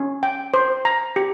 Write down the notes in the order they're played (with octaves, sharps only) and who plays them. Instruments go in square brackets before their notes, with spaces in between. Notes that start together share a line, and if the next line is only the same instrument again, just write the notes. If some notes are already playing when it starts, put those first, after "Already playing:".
Already playing: [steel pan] C#4
G5
C5
A#5
G4